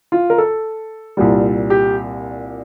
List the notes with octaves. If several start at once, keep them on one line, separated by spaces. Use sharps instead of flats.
F4
A#4
A4
C2 A#2 G3
G4